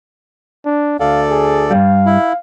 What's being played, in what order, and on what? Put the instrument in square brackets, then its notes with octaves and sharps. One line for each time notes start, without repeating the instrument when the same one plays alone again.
[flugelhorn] D4
[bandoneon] D2 A4 D5 [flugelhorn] F5
[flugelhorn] G#4
[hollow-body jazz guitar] G2 G3 [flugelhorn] F5
[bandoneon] E4